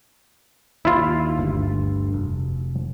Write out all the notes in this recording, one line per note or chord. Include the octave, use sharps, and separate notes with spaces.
D#2 E4 F4
G1 D2 G2
F1